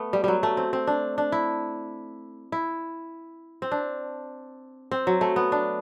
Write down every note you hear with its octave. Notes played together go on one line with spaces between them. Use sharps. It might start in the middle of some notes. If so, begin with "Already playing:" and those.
Already playing: A3 B3
G3
F#3 G3
A3
C4
C4
D4
D4
E4
E4
C4
D4
C4
F#3
A3
B3
D4